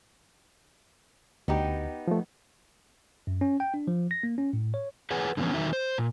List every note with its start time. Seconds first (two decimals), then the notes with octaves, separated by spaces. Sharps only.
1.48 D2 B3 D#4 G4
2.08 F3 A3
3.27 F#2
3.41 C#4
3.60 G5
3.74 D4
3.88 F3
4.11 A#6
4.23 A#3
4.38 C#4
4.53 A2
4.74 C#5
5.11 G#4 B4 C#5 F#5 G#5
5.37 D3 E3 F3 B3 C#4
5.53 E2 D#3 F#3 D#4 E5
5.73 C5
5.98 A#2